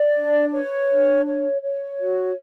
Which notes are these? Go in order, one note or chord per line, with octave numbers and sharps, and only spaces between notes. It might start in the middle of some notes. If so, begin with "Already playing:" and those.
Already playing: D5
D4
B4 C#5
D4
C#5
C#5
F#4